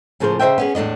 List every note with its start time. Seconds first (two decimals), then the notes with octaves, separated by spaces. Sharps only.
0.20 A2 C#3 F3 G#4 A#4 C5
0.39 C#3 C5 D#5 E5 G5
0.58 B3 C#4 G#4
0.75 E2 A2 D#3 D4 D#5